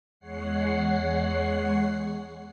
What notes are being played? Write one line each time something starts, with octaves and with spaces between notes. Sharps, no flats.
E2 G#3 C#5 F#5 C7